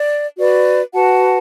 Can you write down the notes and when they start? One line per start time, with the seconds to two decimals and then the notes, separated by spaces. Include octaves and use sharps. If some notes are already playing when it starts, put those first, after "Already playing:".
Already playing: D5
0.36 F#4 B4 D5
0.93 F#4 B4 F#5 A5